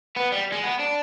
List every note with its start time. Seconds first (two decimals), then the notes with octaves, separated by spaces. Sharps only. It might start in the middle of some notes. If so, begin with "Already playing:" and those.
0.16 B3
0.32 G3
0.52 G#3
0.64 B3
0.80 D4